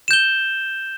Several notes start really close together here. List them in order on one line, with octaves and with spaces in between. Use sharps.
E7 G6 G7